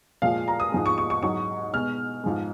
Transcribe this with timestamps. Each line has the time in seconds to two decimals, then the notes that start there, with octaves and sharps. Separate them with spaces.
0.22 A#2 F3 G#3 F5
0.48 A#5
0.60 D#6
0.72 G#2 F3 G#3
0.86 C#6
0.98 C#6
1.10 C#6
1.23 G#2 F#3 C#6
1.73 B2 G#3 F6
2.24 G#2 F3 G#3